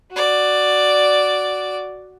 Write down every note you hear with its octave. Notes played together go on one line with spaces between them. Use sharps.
F#4 D5